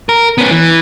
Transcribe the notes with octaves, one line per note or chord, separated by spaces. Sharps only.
A#4
B3 C#4
E3